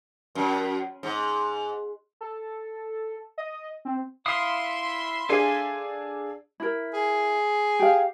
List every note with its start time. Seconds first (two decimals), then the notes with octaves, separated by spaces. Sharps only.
0.35 F#2
1.03 G#2
2.21 A4
3.38 D#5
3.85 C4
4.26 E4 E5 F5 C6 D#6
5.29 D4 G#4 A4 D5 F5 G#5
6.60 E4 A#4
6.94 G#4
7.80 G4 F5